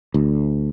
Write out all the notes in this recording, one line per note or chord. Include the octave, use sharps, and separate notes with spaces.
D2